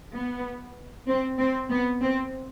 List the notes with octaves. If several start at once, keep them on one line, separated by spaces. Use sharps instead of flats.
B3
C4
C4
B3
C4